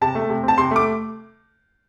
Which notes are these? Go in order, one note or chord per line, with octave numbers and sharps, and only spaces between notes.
C3 A5
A3
C3
C4 A5
C3 C6
A3 D6